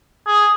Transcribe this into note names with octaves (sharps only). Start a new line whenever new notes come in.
G#4